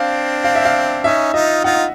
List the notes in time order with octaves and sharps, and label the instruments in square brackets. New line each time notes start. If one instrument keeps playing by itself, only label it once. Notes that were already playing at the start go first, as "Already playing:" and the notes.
Already playing: [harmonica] C4 D4 [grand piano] F5
[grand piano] F5
E5
F5
[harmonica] C#4 D#4 [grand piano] E5
[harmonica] D#4 F4 [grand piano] D#5
[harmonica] D#4 F4 [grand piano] F#5